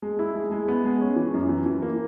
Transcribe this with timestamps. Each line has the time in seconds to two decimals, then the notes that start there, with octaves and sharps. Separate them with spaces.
0.02 G#3
0.19 E4
0.35 G#3
0.51 G#3
0.68 B3
0.85 G#3
1.01 C#4
1.16 E3
1.34 F#2
1.49 E3
1.66 E3
1.82 A#3